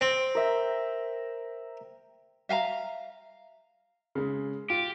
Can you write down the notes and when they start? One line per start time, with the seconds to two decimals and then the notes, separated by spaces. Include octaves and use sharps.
0.01 C4
0.35 A#4 E5 G5
2.49 E5 F5 G#5 A#5
4.15 C#3 G#3
4.70 F4 G4